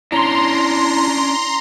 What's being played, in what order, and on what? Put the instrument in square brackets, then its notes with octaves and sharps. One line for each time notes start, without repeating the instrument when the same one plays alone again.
[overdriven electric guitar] C#4 D4 [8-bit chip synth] E4 [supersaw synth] A#5 C6